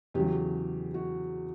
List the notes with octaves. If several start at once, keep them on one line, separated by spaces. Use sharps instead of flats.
E2 C#3 F#3 G4
F#4